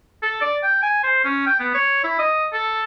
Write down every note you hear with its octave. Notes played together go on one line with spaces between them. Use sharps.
A4
D5
G5
G#5
C5
C#4
G5
B3
C#5
E4
D#5
A4